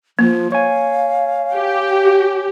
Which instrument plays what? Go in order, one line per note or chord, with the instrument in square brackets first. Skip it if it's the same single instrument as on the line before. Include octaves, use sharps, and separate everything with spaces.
[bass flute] F3 [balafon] A#3
[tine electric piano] C#5 G#5 [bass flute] F5
[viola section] G4